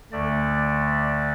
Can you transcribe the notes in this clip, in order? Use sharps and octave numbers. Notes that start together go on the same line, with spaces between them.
D2 D3 A3 D5
D5
D5